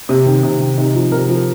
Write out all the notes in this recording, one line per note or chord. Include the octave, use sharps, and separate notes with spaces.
C3
D#3
C3
D#3
C3 D#4
F3
C3 A#4
F3